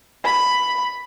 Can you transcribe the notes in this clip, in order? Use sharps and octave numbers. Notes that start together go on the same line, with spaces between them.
B5